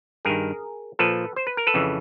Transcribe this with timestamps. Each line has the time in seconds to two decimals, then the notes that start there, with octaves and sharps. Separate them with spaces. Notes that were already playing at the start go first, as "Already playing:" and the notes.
0.25 G2 D#3 G#4 A#4
0.99 A#2 F3 A4 B4
1.36 C5
1.47 B4
1.57 A#4
1.67 A4 B4
1.74 F2 C#3 E3